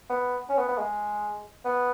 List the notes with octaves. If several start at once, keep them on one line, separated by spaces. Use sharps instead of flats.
B3
C#4
B3
B3
G#3
B3